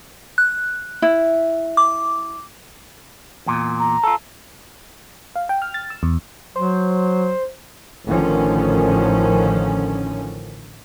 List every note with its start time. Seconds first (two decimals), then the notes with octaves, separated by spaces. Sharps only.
0.38 F#6
1.02 E4
1.77 D6
3.46 E2 A#2
3.80 A#5
4.04 F4 A4
5.36 F5
5.49 G5
5.62 F6
5.74 A6
5.90 E6
6.03 E2
6.56 F#3 C5
8.07 A1 D3 D#3 F3 C#4